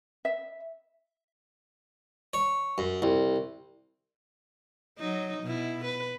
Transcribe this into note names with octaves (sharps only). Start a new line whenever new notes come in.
E5
C#5
F#2
C2
F#3 D#4
B2 E4
B4